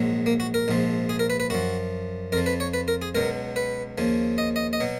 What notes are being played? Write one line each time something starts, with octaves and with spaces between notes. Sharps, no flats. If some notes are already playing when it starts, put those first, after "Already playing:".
Already playing: A#1 G#2 F#3
A#3
F#4
A#4
A#1 G#2 F3
G#4
A#4
B4
B4
F#2 F3 F#4
F2 F3 A#4
B4
C#5
B4
A#4
G#4
C#2 B2 F#3 A#4
B4
D#2 C#3 F3
D#5
D#5
D#5
B2 F#3